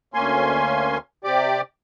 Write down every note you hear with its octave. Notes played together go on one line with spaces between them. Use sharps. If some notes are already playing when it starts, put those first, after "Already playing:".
D2 A#3 C#4 G#5 C6
C3 G4 D5 D6